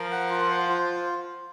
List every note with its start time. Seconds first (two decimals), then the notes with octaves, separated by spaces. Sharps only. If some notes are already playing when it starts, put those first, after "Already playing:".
Already playing: F3 A#4
0.12 F#5
0.30 F4
0.50 C5
0.69 F4